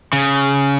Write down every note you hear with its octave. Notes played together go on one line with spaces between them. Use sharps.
C#3